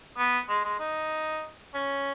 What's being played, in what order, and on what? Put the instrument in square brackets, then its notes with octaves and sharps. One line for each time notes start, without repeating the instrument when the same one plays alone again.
[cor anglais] B3
G#3
G#3
D#4
C#4